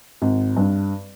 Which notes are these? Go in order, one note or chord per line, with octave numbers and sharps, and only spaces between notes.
G#1
G2